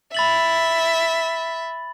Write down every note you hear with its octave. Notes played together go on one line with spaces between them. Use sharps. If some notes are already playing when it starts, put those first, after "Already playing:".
E5 B5 A6 F#7